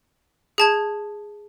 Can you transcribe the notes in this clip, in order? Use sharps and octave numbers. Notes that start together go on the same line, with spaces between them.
G#4 A5 G#6